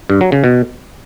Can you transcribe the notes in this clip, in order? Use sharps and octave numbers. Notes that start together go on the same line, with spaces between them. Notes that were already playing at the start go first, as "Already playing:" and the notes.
G2
F#3
C#3
B2